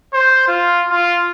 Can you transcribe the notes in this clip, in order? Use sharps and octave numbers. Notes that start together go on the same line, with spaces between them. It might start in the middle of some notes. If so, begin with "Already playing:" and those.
C5
F4
F4